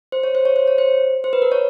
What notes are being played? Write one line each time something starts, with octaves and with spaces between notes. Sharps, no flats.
C5
C#5
C5
C#5
C5
C#5
C5
C5
B4
A#4
C#5